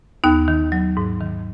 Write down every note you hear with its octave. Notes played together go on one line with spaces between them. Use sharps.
D#2 B3 D#4
D#3
F#3
G#2
D#3